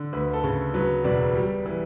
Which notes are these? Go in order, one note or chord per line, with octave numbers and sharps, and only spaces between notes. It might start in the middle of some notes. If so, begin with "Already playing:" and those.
Already playing: D3
D2 B4
A4
C#3
F#3 B4
E1 B4 D5
G3
E3